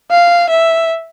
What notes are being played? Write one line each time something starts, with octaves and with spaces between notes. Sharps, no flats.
F5
E5